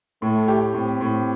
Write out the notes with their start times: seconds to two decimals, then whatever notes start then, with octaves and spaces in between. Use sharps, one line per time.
0.22 A2 A3
0.48 G4
0.74 A2 C4
1.01 A2